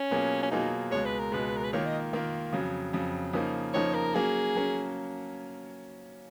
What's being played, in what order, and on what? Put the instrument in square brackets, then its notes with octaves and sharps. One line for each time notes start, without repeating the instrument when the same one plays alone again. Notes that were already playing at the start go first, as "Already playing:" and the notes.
Already playing: [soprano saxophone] C#4
[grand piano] B2 F#3 A#3 F4 G#4
[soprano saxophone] C#4
[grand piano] B2 F#3 A#3 F4 G#4 [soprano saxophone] D#4
[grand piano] C#2 B2 G#3 [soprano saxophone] C#5
[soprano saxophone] B4
A#4
[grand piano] C#2 B2 G#3 [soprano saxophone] B4
[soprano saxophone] A#4
B4
[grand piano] D#3 A#3 F4 [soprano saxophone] C#5
[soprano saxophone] D#5
[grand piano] D#3 A#3 F4
F2 C#3 F#3
F2 C#3 F#3
C#3 F3 A#3 D#4
[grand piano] C#3 F3 A#3 D#4 [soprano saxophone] C#5
[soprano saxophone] A#4
[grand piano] F#3 A#3 C#4 [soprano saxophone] G#4
[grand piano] F#3 A#3 C#4